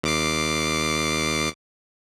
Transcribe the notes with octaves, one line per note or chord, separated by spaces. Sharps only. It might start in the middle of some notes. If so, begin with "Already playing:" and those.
D#2 D6 C7